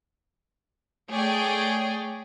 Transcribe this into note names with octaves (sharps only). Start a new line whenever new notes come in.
A3 G#4 C#5 D5 G5